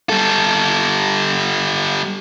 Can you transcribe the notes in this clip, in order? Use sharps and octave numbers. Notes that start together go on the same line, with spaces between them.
G3 A4